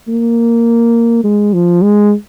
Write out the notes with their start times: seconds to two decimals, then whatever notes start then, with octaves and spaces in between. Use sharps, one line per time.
0.08 A#3
1.24 G#3
1.54 F3
1.82 G#3